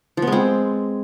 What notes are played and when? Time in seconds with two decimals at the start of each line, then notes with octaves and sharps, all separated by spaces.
0.17 F3
0.22 B3
0.27 G#3
0.32 C4